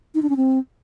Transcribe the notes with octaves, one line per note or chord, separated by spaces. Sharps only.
D#4
D4
C#4
C4